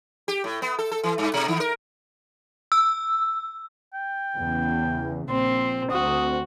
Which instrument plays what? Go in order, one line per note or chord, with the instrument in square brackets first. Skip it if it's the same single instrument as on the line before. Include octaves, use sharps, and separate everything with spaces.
[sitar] G4
A2
B3
A4
A4
E3
G2
B2
D#3
A#4
[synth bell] E6
[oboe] G5
[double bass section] E2 C#3
[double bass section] A#1 [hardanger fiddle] C4 [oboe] C6
[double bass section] D2 C4 [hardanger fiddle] F#4 [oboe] D#6